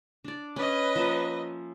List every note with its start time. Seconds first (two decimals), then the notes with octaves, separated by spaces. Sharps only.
0.24 D4 D5
0.56 C#4 B4 D#5
0.96 F3 A#3 E5